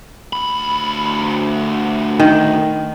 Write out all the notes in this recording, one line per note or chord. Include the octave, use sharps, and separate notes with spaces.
D2 B5
D#3